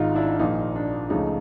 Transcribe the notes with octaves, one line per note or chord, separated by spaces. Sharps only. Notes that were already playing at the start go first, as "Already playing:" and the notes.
Already playing: G#1 G#2 D#3 D#4 F4
D4 E4
A#1 A#2 F3 A#3 D#4
D4
C#2 C#3 F3 A3 D#4